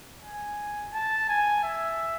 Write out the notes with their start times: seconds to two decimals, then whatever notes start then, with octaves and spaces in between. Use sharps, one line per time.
0.22 G#5
0.93 A5
1.29 G#5
1.64 E5